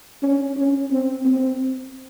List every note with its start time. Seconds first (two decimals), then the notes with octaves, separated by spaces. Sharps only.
0.23 C#4
0.57 C#4
0.91 C4
1.25 C4